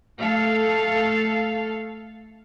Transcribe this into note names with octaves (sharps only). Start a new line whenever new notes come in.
A3 A4 F5